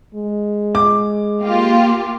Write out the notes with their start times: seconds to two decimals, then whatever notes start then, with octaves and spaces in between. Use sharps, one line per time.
0.15 G#3
0.75 D6
1.43 A#3 F4 G4